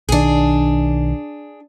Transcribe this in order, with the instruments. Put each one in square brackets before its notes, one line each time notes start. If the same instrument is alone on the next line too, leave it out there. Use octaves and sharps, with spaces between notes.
[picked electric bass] B1 D#3 [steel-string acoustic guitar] D4 G#4